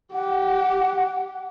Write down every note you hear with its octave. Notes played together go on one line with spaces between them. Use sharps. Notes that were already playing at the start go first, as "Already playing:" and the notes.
G4 F#5